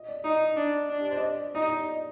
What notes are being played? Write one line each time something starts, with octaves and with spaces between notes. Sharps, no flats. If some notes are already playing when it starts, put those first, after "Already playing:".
Already playing: D#5
D5
D#4 D#5
D4
D4
G4
C5
D#5
D5
D#4 D#5
D#5